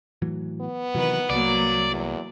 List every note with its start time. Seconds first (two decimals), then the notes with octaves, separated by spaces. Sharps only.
0.22 A2 E3 F#3
0.61 B3
0.95 C3 D#3 E3 F#3 B4
1.30 C2 F#3 A#3 D5
1.91 E2